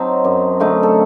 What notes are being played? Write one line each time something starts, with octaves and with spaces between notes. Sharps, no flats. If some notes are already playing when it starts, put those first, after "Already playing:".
Already playing: F#3 C4 D#4 A5
F#2
D3 A3 D#4
A4